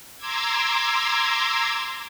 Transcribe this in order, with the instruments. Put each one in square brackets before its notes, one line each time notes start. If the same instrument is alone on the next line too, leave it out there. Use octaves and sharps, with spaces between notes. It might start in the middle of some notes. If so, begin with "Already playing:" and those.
[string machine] A#5 C6 D6 E6 G#6